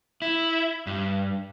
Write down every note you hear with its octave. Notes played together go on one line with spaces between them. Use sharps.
E4
G2